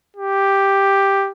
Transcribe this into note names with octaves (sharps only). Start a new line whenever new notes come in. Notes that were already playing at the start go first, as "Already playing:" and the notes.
G4